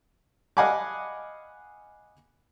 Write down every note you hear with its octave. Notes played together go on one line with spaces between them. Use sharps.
D#5 F5 F#5 G#5 B5 D6